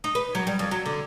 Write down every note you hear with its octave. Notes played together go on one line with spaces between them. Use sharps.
D#4
B4
F#3
G3
F2
F#3
D3